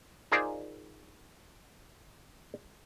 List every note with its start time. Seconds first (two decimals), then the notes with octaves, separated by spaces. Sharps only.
0.32 D#4 F4 G#4 A#4 C5 D5